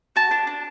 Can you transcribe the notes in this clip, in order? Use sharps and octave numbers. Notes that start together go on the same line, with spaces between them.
F#4 A5
D4
D4